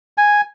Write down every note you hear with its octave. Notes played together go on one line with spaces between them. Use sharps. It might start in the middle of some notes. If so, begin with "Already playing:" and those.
G#5